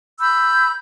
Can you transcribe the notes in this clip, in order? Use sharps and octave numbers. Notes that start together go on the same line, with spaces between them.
B5 E6 G6